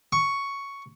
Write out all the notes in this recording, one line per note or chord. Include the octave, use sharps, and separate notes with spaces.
C#6